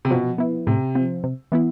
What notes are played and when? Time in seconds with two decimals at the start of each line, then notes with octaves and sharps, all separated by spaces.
0.05 C3
0.11 B2 F3
0.38 B3 E4
0.67 A2 C3
0.95 F3 C4
1.24 C3
1.52 E3 B3 E4